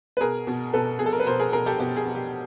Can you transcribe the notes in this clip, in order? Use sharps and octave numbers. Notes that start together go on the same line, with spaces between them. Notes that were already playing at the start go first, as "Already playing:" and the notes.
B4
B2 G#4 A#4
B2
B2 A4 B4
B2 G#4
A4
A#4
B4
B2 A#4 C5
G#4 A#4
B2 G#4 A#4
G4 A4
B2 G4
G#4
B2
G4